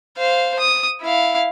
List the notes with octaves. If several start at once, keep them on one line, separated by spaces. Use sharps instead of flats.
C5 F5
D#6
E4 F5